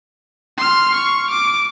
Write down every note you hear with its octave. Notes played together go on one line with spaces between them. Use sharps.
C6 F6
C#6
D6